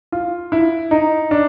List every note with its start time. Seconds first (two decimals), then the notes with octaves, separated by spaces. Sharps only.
0.12 F4
0.52 E4
0.91 D#4
1.31 D4